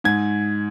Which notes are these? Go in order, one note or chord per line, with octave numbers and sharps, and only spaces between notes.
G#2 G#6